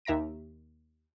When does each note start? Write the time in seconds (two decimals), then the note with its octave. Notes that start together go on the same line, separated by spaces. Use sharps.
0.05 D#2 E5 A#5 A#6 D7